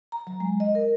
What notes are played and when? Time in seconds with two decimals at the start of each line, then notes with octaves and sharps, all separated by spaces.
0.12 A#5
0.27 F#3
0.40 G#3
0.60 D#5
0.75 A#4